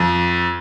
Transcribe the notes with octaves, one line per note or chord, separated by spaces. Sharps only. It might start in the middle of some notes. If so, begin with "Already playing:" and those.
Already playing: F2